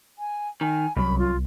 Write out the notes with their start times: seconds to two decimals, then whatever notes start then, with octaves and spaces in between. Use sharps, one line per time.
0.19 G#5
0.61 D#3 G#5
0.97 C2 F#2 B5
1.19 F4